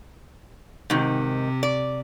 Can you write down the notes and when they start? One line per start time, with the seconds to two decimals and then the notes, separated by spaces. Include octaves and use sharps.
0.90 G#2 C3 D#3
1.63 D5